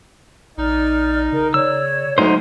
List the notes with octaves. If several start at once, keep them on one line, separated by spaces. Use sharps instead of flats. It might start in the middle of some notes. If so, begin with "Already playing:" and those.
A#1 D#4 D5 F6
C#3 A#4
C#3 C#5 D5 E6
D2 F#3 A3 D#4 C5